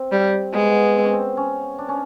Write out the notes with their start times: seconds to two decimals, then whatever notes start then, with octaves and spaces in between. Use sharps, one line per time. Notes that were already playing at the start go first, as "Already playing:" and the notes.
Already playing: C4
0.12 G3
0.54 G#3 B3
0.96 C4
1.04 C#4
1.13 C4
1.37 C#4
1.79 D4
1.89 C#4